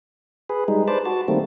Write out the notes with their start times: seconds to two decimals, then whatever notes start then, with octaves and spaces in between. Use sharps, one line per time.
0.50 G#4 B4
0.68 G3 G#3 D#4
0.88 B4 C5 D5 A5
1.05 F#4 A5
1.28 D#3 G3 A3 A#3 C4